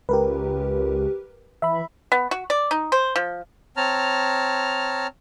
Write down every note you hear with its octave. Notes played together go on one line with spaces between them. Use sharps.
C#2 G4 A#4 B4
E3 E5 B5
B3
F#4
D5
D#4
C5
F3
C4 C#5 A5 A#5 F6